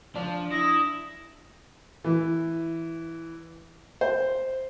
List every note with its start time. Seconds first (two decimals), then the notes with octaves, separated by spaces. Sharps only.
0.16 F3 D4
0.52 E4 D#6 A#6
2.04 E3
4.01 C5